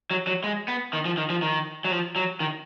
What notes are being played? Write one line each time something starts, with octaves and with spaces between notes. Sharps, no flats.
F#3
F#3
G#3
B3
D#3
F3
D#3
F3
D#3
F#3
F3
F#3
D#3